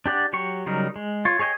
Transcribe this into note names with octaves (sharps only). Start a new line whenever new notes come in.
D4 G4 D5 F#5
F#3 G4 C#6
C#3 F#3 G3 D#4 A#4
G#3
F4 C#5
G#4 C#5 D#5 G5 G#5